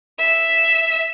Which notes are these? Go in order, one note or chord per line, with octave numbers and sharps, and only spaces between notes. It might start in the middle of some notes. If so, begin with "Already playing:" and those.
E5